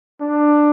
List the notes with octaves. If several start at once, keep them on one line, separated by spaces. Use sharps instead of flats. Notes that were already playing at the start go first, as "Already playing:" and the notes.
D4